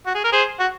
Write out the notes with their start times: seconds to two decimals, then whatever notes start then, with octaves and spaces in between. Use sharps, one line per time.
0.06 F#4
0.15 G#4
0.24 A#4
0.32 G#4 C5
0.60 F#4